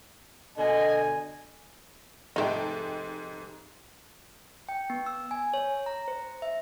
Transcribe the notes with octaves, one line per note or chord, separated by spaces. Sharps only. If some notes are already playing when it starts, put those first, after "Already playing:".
B2 D3 D#5 G#5
F1 G#2 A3 D#4 G5
G5
B3
E6
G#5
C#5
A#5
C5
E5